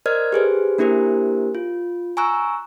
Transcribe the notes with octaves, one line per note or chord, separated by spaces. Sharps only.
A#4 C5 D5 D#5 F6 G#6
G4 G#4 B4 C5
A#3 D4 E4 G4 A#4 C5
F4
G#5 A#5 C#6 E6 F#6